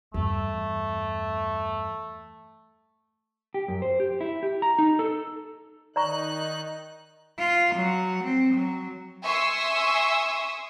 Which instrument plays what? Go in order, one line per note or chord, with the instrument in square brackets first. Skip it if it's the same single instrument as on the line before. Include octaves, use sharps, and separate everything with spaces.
[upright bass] E2 G2 [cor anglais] A3
[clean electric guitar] G4
F#2
C5
G4
E4
G4
A#5
D#4
A4
[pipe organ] D#3 D#4 F#6 [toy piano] D5 A#5 C#6
[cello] F4
F#3 F#5
C4
F#3
[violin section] E5 G#5 C6 C#6 D#6 E6